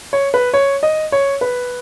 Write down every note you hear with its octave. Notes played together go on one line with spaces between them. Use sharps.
C#5
B4
C#5
D#5
C#5
B4